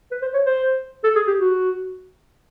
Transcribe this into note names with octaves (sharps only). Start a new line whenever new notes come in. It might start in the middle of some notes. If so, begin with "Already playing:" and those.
B4
C5
C#5
C5
A4
G#4
G4
F#4